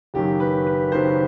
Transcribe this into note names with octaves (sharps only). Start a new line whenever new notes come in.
F#1 F#2 D#3 F#3 G4
B4
B4
F#1 F#2 D#3 F#3 C5